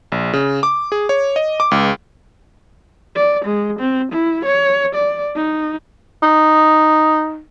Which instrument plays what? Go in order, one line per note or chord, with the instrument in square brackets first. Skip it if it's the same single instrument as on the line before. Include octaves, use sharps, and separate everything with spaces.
[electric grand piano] A#1
C#3
D6
G#4
C#5
D#5
D6
C#2
[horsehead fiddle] D5
G#3
C4
E4
C#5
D5
D#4
[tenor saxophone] D#4